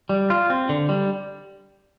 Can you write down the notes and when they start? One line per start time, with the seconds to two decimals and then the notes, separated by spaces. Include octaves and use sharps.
0.09 G3
0.30 F4
0.50 C4
0.69 D3
0.89 G3